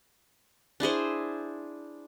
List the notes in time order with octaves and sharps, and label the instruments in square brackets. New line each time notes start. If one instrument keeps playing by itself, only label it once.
[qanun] D4 E4 G#4 C5